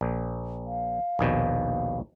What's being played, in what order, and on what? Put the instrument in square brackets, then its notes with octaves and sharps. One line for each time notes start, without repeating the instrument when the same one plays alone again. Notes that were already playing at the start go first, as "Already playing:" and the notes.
[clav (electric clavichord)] A#1
[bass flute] F5
[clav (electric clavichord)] A#1 D#2 B2